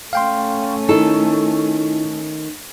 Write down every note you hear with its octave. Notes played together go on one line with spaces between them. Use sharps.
A3 C#4 F5 G5 C6
D#3 D#4 E4 A4